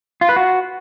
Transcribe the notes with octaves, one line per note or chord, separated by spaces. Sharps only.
F4
B4
F#4